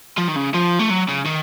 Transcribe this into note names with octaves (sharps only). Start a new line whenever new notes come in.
F3
D#3
C#3
F3
A3
F#3
C#3
D#3